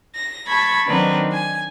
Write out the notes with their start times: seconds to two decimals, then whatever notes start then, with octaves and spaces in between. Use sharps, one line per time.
0.15 A#6
0.48 A5 B5 C#6 G#6
0.86 D#3 F#3 C4 D4 D#4 B4
1.32 G#5